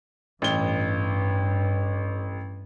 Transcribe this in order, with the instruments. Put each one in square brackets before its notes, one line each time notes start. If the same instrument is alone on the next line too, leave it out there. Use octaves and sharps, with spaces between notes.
[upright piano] A1 G7 [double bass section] G2